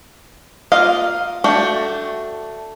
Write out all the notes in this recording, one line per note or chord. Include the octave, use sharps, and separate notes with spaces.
A#3 F4 D#5 F5
A3 D4 F#4 G5